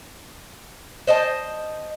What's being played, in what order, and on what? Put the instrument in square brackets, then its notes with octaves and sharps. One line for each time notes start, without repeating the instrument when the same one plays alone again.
[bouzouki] C5 D#5 G5 A5